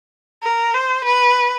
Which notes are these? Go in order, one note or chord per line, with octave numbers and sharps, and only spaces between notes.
A#4
C5
B4